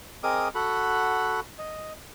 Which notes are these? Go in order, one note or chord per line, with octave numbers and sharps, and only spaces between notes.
C4 G#4 A#4 D#5 D6 D#6
F#4 A4 F#5 B5
D#5